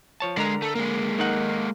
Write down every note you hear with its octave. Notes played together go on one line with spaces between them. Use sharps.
F3 C#5 A5
B1 D3 G#3 A#4 A#5
A3
G#3 A#3
D#3 D#4 F#5